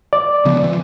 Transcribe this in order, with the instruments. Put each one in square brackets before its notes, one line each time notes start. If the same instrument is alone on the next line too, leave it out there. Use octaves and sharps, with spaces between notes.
[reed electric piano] D5
[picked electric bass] C#3 F3 B3
E3 F3